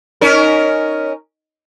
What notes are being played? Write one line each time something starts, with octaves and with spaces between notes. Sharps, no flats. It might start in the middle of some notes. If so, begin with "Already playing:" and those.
C#4 D#4 A#4